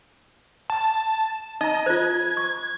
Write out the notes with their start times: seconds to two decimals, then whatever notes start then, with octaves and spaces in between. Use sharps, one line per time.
0.70 A5
1.61 D#4 D#5 A#5
1.86 F4 C5 G#6
2.37 C#6